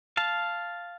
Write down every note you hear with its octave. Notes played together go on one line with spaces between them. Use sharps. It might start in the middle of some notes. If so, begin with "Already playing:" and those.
F5 A5